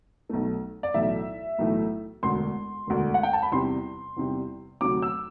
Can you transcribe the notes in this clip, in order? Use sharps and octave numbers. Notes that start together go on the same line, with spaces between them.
B1 B2 A3
D5
B1 A2 E3 A3 E5
B1 A2 E3 A3
E1 D2 D3 C6
E1 D2 D3
F#5
G5
A5
B5
E2 C3 G3 C6
E2 C3 G3
D2 C3 F#3 D6
E6